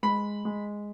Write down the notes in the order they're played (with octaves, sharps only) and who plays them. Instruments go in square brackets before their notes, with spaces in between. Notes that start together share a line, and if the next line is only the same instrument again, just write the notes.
[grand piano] G#3 B5
G#3